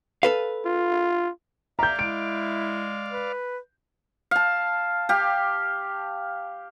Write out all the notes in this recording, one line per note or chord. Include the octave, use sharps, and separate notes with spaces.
A4 B4 F5
F4
D5 E5 F5 A#5 G6
G#3 E4 D7
B4
F5 A5
G4 F5